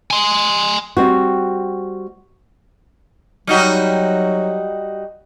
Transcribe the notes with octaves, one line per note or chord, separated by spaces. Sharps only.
G#5 C6
G3 C4 F#4
F#3 G3 D#4 F#4